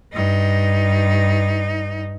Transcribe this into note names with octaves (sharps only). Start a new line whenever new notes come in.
G2 D#4